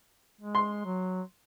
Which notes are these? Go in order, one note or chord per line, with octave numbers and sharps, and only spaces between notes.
G#3
C6
F#3